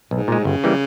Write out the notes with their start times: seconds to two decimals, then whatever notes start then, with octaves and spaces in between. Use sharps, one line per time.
0.11 B1 G#2
0.28 A#2 G#3
0.45 G1 C#3
0.64 E3 G3 A#3